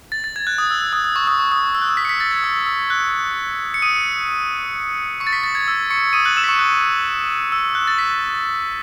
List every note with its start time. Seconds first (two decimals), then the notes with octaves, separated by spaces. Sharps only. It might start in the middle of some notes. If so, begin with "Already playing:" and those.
0.12 A6
0.24 A6
0.36 G#6
0.47 F#6
0.58 D#6
0.71 E6
0.81 E6
0.93 D#6
1.04 D#6
1.16 C#6
1.27 D#6
1.39 C#6
1.52 D#6
1.75 E6
1.82 F#6
1.89 E6
1.97 B6
2.05 C#7
2.09 B6
2.20 A6
2.31 G#6
2.44 E6
2.66 E6
2.90 F#6
3.74 C#7
3.82 D#6 D#7
5.20 C#6 C#7
5.27 A6
5.33 B6
5.44 A6
5.55 G#6
5.68 E6
5.90 C#6 C#7
6.13 D#6 D#7
6.25 F#6 F#7
6.37 E6 E7
6.44 B6
6.48 C#6 C#7
6.59 F#6
7.52 E6
7.75 F#6
7.87 A6
7.98 B6